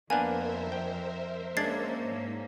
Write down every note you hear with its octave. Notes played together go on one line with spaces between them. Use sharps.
F2 A#3 B3 D4 A#4 C5 E5 G#5
G5
G#3 A#3 C#4 D4 G#6 A6 C7
G#2